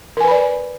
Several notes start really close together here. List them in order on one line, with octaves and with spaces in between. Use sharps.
A#4 G#5 B4 B5 D5